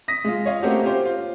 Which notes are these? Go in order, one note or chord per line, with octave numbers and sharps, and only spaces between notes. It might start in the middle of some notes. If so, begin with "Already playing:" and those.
D#6 A#6 B6
G#3 F4
C#5 D#5 F5
A3 A#3 C4 C#4 F#4 G4
C#4 F4 G4 C5
F4